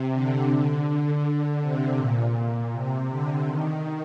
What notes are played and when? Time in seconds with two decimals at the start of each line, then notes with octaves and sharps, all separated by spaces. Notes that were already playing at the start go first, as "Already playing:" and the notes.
Already playing: C3
0.12 D3
1.24 D3
1.61 C3
1.98 A#2
2.35 A#2
2.72 C3
3.09 D3
3.47 D#3